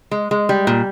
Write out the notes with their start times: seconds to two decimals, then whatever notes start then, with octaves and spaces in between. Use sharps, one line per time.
0.11 G#3
0.31 G#3
0.49 G3
0.67 A#2